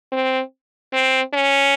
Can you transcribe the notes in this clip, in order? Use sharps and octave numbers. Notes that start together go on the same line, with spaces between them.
C4
C4
C#4